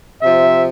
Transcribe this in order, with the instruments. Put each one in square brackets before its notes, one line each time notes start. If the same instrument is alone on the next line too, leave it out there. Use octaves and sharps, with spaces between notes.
[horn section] C3 F3 E5